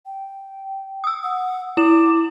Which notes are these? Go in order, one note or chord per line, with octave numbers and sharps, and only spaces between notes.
G5
D#6 E6
F#5
E4 D6 E7